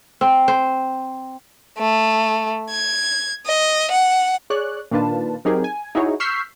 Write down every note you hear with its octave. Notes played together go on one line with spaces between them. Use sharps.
C4
C5
A3
G#6
D#5
F#5
G#4 C#5 D5 F#6
A#2 D#3 D4 F4 B4 A5
F#3 C4 D#4 G4 G#4 A#4
G#5
D#4 E4 F#4 G#4 C#5
C#6 E6 F6 G6 B6 C7